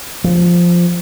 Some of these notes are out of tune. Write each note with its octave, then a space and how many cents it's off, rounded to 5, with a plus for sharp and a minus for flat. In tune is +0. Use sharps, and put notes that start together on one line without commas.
F3 +0